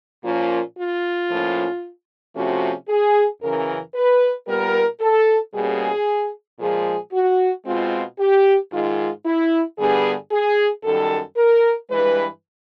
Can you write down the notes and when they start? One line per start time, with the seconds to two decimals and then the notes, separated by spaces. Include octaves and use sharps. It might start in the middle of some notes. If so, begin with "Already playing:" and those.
0.24 A#2 F3 A#3 C#4 F4
0.77 F4
1.29 A2 F3 A#3 C#4
2.35 C3 F3 A3 C#4 F#4
2.89 G#4
3.41 F#2 C#3 E3 A#4
3.95 B4
4.48 A#2 G3 B3 A#4
5.00 A4
5.53 B2 G3 A#3 C#4 G#4
6.60 A#2 F3 G#3 G#4
7.13 F#4
7.66 B2 G#3 C4 F4
8.19 G4
8.72 G#2 D#3 G#3 F4
9.25 E4
9.78 G2 D3 G3 B3 G#4
10.31 G#4
10.84 F#2 D#3 G3 A4
11.37 A#4
11.90 G2 E3 G#3 B4